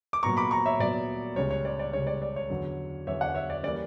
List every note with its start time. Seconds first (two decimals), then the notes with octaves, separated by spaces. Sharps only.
0.13 D6
0.23 A#2 F#3 B3 A#5 C#6
0.37 B5 D6
0.51 A#5 C#6
0.66 C#5 E5
0.79 A#2 F#3 B3 D5
1.36 C#2 C#3 G3 C#4 C#5
1.51 C#5
1.65 D5
1.79 D5
1.93 C#2 C#3 G3 C#4 C#5
2.07 D5
2.22 D5
2.36 C#5
2.50 E2 D3 F#3 C#4
3.07 E2 D3 F#3 C#4 C#5 E5
3.21 D5 F#5
3.34 C#5 E5
3.50 D5
3.63 E3 G3 A#3 C#4 D5